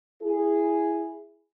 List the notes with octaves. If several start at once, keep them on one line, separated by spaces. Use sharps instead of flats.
E4 G#4